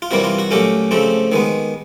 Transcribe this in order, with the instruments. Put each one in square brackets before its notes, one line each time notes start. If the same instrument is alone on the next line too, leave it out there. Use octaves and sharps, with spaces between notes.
[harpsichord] F4
C3 E3 G3 A#3 F#4
F4
F#4
A#2 F#3 A3 C#4 G4
C#3 F3 A3 C4
D#3 G#3 B3